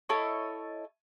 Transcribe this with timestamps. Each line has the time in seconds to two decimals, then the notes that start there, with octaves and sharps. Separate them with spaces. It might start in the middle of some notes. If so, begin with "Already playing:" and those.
0.09 E4 A4 C#5 D#5